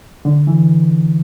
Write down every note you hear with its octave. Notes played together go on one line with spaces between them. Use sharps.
D3
E3